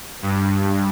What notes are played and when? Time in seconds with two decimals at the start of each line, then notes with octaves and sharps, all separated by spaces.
0.22 G2